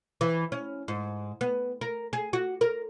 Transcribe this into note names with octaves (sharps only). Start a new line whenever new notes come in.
E3
C#4
G#2
B3
A#4
G#4
F#4
A#4